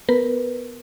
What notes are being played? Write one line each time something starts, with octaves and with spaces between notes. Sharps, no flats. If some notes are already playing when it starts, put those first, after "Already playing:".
B3 A#4 B4